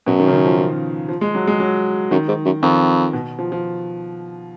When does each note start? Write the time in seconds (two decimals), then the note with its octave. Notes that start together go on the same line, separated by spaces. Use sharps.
0.07 F#2 B2
0.20 D#3
0.27 C#3
0.32 D#3
0.45 F3
0.58 F3
1.09 F3
1.21 G#3
1.35 F#3
1.47 G#3
1.60 F#3
2.11 F#2 D#3
2.28 G#2
2.45 F#2
2.62 F2 D#3
3.13 B2
3.39 F3
3.52 F3